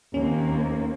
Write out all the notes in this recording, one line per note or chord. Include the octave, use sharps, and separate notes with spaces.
D#2 A#3 C4 C#4